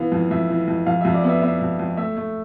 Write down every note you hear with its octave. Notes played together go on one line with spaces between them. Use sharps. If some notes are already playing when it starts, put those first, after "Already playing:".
Already playing: E3 B3 F5
F2
F2 E5
E3
F2
F2 F5
F2 E5
D5
B3 E5
B3 E5
F2
F2
A3 E5
A3